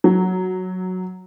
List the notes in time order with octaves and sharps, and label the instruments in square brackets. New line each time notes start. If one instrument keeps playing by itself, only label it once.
[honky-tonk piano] F#3